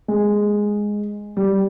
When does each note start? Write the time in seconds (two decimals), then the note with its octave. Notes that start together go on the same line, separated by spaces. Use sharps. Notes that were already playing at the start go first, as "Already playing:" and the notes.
0.08 G#3
1.37 G3